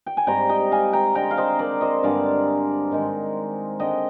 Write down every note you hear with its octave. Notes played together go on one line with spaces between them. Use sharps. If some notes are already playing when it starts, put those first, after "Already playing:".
G5
G#5
G#2 G3 C4 G5 A#5
D#5 G5
F5 G#5
G5 A#5
D3 G#3 C4 G5 A#5
F5
C5 D#5
A#4 D5
C5 D#5
G2 D3 G#3 C4 D5 F5
G#2 D#3 G#3
D3 G#3 C4 D#5 G5